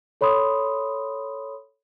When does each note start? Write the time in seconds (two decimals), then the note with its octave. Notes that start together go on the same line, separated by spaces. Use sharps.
0.21 A4 C#5 B5 C6 D#6